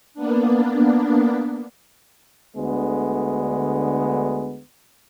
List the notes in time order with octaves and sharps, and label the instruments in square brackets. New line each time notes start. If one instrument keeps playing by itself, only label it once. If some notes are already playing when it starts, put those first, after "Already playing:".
[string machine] A#3 B3 D4
[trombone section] D2 D3 G#3 B3